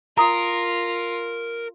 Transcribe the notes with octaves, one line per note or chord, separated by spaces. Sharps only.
F4 A#4 A#5 D#6